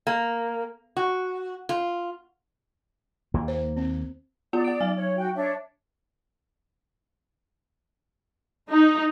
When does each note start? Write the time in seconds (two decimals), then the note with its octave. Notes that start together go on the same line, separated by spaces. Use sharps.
0.07 A#3
0.97 F#4
1.69 F4
3.34 D#2 A#3
3.48 C5
3.76 C4
4.53 B3 F4 D5 F#5
4.64 F#5 D7
4.80 F#3 G#5
4.94 C#5
5.17 F#4 G5
5.35 D4 C#5 E5
8.69 D#4